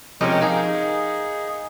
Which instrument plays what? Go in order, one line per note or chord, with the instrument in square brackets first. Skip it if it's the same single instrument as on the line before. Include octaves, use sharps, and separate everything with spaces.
[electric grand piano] C3 [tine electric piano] F3 [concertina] G#3 C#4 A#4 [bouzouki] D#4 G4 C#5
[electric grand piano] D#4 [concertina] G#4 [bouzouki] A#4 [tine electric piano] D#5 F5 G#5